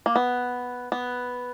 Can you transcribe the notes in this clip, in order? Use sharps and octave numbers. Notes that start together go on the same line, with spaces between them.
A#3
B3
B3